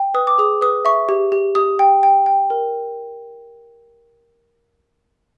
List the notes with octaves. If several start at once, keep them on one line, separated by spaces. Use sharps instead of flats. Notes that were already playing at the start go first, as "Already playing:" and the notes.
Already playing: G5
B4 D#6
D6
G#4 D#6
B4 D#6
E5 C#6
G4
G4
G4 D#6
G5
G5
G5
A#4